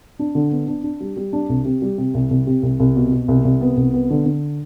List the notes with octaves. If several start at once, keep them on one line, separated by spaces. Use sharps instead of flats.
D4
D3
B3
D4
D4
G3
G3
D4
C2
C3
G3
C3
C2
C2
C3
C2
C2
B2
B2
C2
C2
B3
C2
B3
D3
D3